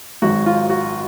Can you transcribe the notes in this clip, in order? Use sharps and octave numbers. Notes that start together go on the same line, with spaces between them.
G#1 G#2 F#3 F#4
F4
F#4